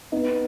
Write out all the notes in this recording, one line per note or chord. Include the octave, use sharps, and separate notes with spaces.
B3 D#4